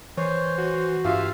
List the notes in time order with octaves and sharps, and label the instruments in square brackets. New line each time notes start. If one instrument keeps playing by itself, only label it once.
[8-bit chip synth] E3 [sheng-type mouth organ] C5 [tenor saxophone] C#5
[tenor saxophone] F#4
[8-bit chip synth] G2 [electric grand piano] F4 G4 [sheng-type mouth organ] E5 F5